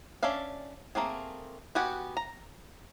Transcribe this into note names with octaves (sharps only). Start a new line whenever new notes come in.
C#4 D4 D5 E5 F5
A3 A#3 C4 G#4
B3 F#4 G4 F#5 G#5
A#5